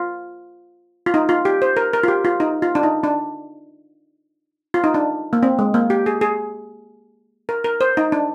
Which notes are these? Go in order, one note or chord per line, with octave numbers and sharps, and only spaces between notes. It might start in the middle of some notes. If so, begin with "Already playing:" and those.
Already playing: F4
F4
D#4
F4
G4
C5
A#4
A#4
F4
G4
F4
D#4
F4
D4
D#4
D4
F4
D#4
D4
A#3
C4
G#3
A#3
G4
G#4
G#4
A#4
A#4
C5
D#4
D4